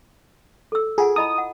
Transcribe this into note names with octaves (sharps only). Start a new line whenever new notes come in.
A4 E6
F4 G#4 F#5 G#5
E4 D#5 B5 D#6
F#5